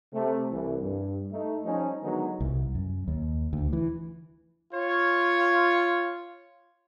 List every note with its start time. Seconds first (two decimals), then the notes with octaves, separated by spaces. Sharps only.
0.14 C3 A3
0.51 C2 E3
0.82 G2
1.32 A3 D#4
1.64 F3 G3 C#4 D#4
2.02 D3 D#3 F#3 G#3 B3 D#4
2.40 C2
2.75 F#2
3.08 D#2
3.53 D2
3.73 E3
4.73 F4 C#5